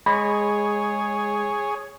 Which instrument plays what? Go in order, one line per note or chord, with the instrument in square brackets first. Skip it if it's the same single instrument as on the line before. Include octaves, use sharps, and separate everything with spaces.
[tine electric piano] G#3 [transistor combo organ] G#4 C#5 [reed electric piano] B5